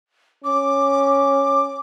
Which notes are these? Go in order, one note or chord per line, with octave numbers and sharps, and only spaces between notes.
C#4 D6